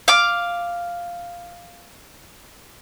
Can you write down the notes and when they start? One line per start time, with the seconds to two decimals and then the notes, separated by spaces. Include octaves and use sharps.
0.08 F5 D6